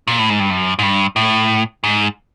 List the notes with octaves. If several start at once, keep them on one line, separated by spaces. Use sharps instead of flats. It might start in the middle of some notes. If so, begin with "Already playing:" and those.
A#2
A2
G#2
G2
F#2
G#2
G2
A2
G#2